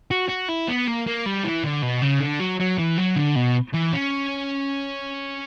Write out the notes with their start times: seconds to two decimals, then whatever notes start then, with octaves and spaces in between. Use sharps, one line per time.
0.11 F#4
0.29 F#4
0.49 E4
0.68 B3
0.87 A#3
1.06 A#3
1.26 G3
1.44 E3
1.64 D3
1.82 B2
2.02 C#3
2.20 D3
2.40 F#3
2.60 F#3
2.78 E3
2.98 F#3
3.16 D3
3.36 B2
3.74 E3
3.93 C#4